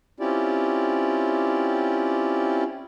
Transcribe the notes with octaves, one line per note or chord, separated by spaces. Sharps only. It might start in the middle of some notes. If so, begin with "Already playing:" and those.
C4 C#4 E4 F4 G4 D5